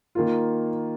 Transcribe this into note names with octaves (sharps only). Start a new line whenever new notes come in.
D#3 A#3 F4